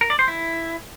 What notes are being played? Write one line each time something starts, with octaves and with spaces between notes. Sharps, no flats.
A#4
D5
C5
E4